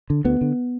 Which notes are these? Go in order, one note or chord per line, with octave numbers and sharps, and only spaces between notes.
D3
D2 B3
D3